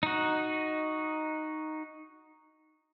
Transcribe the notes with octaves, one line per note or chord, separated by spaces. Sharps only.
D#4 F#4